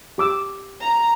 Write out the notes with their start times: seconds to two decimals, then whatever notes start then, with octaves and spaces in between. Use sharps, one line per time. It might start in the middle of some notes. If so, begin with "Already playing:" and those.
0.18 G4 D6 E6
0.81 A#5